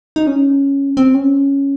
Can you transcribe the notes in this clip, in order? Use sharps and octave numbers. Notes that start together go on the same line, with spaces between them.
D#4
C#4
C4
C#4